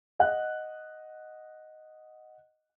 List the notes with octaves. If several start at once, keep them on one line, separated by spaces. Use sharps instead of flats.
D#5 F#5 F#6